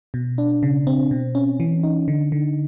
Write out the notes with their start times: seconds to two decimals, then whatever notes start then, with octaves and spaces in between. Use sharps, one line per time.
0.14 B2
0.38 D4
0.63 C#3
0.87 C4
1.11 B2
1.35 C#4
1.60 E3
1.83 D#4
2.08 D3
2.32 D3